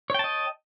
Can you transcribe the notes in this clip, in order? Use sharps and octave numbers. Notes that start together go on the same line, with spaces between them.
C#5 D#5 G5 A5